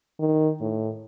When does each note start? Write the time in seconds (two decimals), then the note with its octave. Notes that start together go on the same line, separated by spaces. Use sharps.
0.19 D#3
0.61 A2